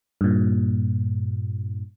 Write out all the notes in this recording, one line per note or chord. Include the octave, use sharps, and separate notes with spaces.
G2 A#2